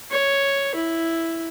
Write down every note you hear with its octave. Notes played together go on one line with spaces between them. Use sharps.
C#5
E4